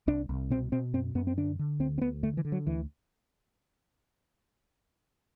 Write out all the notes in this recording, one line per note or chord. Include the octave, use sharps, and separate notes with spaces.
C2 D4
C2
B2 C4
B2 C4
F#2 C4
F#2 B3
C4
D3 D4
D3
D2 C4
C4
D2 B3
D3 A3
E3
D3
F#3
D2 E3